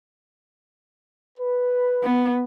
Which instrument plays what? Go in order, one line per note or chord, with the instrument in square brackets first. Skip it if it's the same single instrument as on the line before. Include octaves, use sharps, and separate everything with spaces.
[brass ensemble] B4
[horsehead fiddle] B3